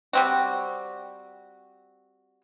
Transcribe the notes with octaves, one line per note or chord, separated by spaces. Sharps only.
G3 C4 F#4